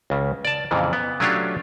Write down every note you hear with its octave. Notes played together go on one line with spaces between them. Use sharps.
C#2 C#3
D5 A5
F2 A#2 C#3 E3
B3
F#3 A3 C#4 D4 F4 G4